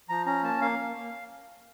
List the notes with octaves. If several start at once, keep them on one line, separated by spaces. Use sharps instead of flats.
F3 A#5
C#4 A#5
A#3 A5
A#3 F5
A#3
A#3